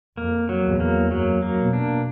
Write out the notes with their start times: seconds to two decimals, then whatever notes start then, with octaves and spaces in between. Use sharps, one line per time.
0.17 F2 A#3
0.49 F#3
0.65 E2
0.80 A#3
1.11 F#2 F#3
1.42 A#3
1.58 B2
1.73 D4